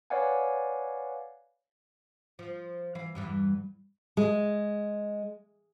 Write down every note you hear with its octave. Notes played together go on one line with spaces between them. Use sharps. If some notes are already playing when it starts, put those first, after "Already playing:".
B4 C#5 D5 F5 F#5 G#5
F3
E3 F5
E2 G2 E3
G#3